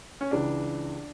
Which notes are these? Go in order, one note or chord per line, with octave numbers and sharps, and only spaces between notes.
C#4
C#2 C#3 E3 D4